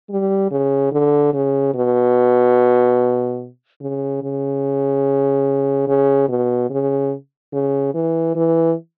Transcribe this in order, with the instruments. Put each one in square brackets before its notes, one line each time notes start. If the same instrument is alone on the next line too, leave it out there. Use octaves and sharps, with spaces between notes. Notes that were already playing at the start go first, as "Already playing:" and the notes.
[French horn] G3
C#3
D3
C#3
B2
C#3
C#3
C#3
B2
C#3
C#3
E3
E3